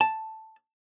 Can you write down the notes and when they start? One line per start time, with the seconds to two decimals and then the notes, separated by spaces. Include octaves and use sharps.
0.01 A5